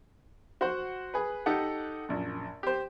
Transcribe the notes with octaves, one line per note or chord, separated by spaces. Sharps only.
F#4 C5 F#5
G#4 B4
D#4 G4 A4 F#5
A#1 F#2
G4 C5